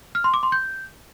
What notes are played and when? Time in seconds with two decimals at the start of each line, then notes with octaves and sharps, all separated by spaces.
0.15 F6
0.24 C6
0.34 D6
0.43 C6
0.52 G6